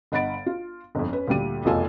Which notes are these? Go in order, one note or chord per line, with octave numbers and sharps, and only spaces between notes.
G1 D#5 F#5 B5 A6 D7
F4
G1 F2
C#4 B4
D2 A#2 G3 D#7
F1 B1 E2 F4 A4 G#5